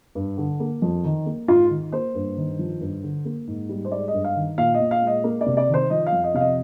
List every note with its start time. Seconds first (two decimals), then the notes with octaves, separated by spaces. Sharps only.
0.15 G2
0.38 D3
0.60 A#3
0.82 F2
1.04 D#3
1.26 A#3
1.48 G#2 F4
1.70 D#3
1.92 A#3 C5
2.15 G2
2.37 D#3
2.59 F3
2.81 G2
3.03 D3
3.25 A#3
3.47 G#2
3.69 G3
3.85 C5
3.91 G#3 D5
4.08 D#5
4.14 G2
4.24 F5
4.36 D#3
4.58 A#2 F5
4.74 D#5
4.80 A#2
4.91 F5
5.02 G#3
5.07 D#5
5.24 A#3
5.41 D5
5.46 C3
5.57 D5
5.68 D#3
5.74 C5
5.90 F3 D#5
6.06 F5
6.12 F2
6.24 D#5
6.34 C3 F5
6.40 D#5